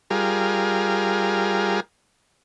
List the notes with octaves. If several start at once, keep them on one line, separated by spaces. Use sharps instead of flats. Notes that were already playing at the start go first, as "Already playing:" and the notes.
G3 F4 G#4 A#4